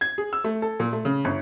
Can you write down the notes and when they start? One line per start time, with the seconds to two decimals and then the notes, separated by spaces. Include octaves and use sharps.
0.01 G#6
0.18 G#4
0.33 E6
0.44 A3
0.62 A4
0.80 A#2
0.93 A3
1.05 C#3
1.25 G1